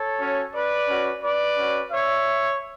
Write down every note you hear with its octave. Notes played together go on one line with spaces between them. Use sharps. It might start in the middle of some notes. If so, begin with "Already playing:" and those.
Already playing: A4 C#5
C#4 F#4
B4 D5
C#4 F#4
B4 D5
C#4 F#4
C#5 E5